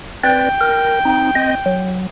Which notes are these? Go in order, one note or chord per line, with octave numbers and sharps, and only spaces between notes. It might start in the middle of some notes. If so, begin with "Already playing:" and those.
C4 B4 D5 G5
A#4
C4 D#4
C4 D#5 G6
F#3